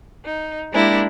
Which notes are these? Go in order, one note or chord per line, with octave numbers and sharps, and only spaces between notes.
D#4
G#3 A#3 D4 E4 G4